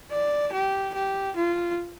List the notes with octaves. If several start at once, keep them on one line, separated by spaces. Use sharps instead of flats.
D5
G4
G4
F4